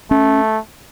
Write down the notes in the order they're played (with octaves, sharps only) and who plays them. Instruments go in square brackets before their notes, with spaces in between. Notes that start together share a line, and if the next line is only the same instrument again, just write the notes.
[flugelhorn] A3 [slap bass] C#4